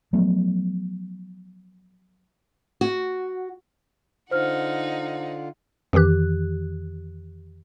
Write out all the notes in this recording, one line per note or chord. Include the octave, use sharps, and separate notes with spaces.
F3 F#3 A3 B3
F#4
D3 D#4 F4 C5 F#5 F6
F2 D#3 E3 G4 F#6